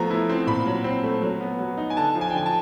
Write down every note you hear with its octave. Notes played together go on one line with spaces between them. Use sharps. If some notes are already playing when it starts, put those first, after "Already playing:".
Already playing: F3 A3 B3 A#5
E4
C4
A#2 B5
F#3
C4
A3
F#3
B3
F#3
D#4
G#5
D3 A5
F3
G#5
G5
D3 G#5
A5